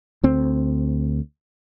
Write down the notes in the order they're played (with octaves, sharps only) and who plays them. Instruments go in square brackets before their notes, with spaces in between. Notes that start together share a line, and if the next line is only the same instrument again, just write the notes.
[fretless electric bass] D2 C4